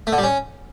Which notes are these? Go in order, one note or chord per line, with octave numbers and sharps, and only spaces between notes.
A3
D3
G3
C#4